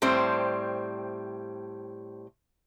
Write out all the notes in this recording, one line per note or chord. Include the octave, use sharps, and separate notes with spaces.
A2 G3 C4 C5